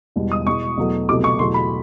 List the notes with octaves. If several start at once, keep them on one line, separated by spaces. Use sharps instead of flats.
E1 E2 B2 G3
D#6
E2 B2 G#3 C#6
E2 B2 F#3 A3
C2 B2 F#3 A3 D6
C#6
E2 B2 F#3 A3 C6
B5